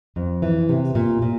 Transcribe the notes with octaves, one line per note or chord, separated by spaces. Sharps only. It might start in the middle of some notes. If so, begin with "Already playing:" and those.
F2
E3
C3
A#2
A#2